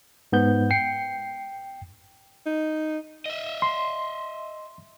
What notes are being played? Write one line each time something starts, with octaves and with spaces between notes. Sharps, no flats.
G#2 B3 G6
G5 C7 C#7
D#4
D#5 E5
C6